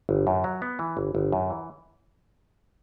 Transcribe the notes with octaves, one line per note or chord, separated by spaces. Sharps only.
G1
F#2
F#3
B3
E3
G1
G1
F#2
E3